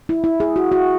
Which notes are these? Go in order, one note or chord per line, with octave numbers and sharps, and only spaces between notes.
E4
E4
G#4
F#4
F#4